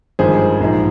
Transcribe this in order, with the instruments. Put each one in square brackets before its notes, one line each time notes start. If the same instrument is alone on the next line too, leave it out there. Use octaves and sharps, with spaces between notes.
[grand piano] G#1 G2 F3 G#4 C5
A#1 G#2 F3